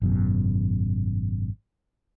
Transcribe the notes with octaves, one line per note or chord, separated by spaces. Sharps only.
G#1 F#2 B2